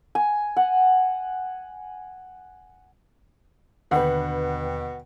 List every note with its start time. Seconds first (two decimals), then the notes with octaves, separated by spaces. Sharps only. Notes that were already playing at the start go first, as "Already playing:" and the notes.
0.15 G#5
0.57 F#5
3.91 D#2 B2 D3 D4 B4 F#5 G5